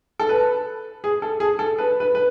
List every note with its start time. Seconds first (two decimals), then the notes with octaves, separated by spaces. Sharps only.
0.19 A4
0.29 B4
1.04 G#4
1.22 A4
1.40 G#4
1.59 A4
1.79 B4
2.00 B4
2.15 B4